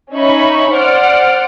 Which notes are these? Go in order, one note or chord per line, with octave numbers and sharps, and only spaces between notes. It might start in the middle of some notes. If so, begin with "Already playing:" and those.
C#4 D#4 C#5 E5 B5 C#6
C5 D5 F#5 F6 D7